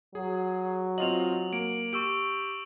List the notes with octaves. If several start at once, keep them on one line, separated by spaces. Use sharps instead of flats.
F#3 G#4
C4 F4 D#5 F7 F#7
A#3 D7
G4 C#6 E6 D7